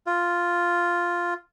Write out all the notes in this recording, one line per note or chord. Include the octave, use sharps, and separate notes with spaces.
F4